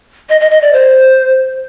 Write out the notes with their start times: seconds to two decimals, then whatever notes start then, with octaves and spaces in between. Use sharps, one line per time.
0.29 D#5
0.40 D#5
0.51 D#5
0.62 D5
0.73 C5